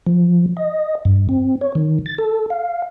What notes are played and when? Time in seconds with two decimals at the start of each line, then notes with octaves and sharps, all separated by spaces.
0.07 F3
0.57 D#5
1.05 G2
1.29 C4
1.61 C#5
1.75 D#3
2.06 A6
2.18 A4
2.50 F5